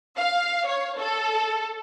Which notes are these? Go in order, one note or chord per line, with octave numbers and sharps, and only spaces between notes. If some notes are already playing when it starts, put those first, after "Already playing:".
F5
C#5
A4